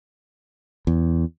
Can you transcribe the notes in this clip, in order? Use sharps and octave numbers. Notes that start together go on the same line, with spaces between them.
E2